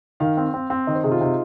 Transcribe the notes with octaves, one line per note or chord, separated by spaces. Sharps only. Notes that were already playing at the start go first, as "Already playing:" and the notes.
D#3 F5
C4
C4
C4
D#3 D#5
C5
C3 G#4
F4
C3 D#4